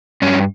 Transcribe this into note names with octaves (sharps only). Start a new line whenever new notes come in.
G2 C#4